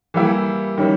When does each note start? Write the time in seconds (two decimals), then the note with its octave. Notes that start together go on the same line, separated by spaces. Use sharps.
0.14 E3 G3 A#3 E4 G4
0.78 D#3 G3 C#4